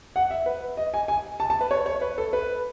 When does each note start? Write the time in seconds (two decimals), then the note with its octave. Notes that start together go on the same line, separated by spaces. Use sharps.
0.16 F#5
0.31 E5
0.46 B4
0.77 D#5
0.94 G#5
1.08 G#5
1.40 A5
1.50 A5
1.61 B4
1.71 C#5
1.86 C#5
2.01 B4
2.18 A4
2.33 B4